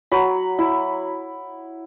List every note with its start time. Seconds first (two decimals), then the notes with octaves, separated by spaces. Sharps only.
0.12 F#3 B5
0.59 E4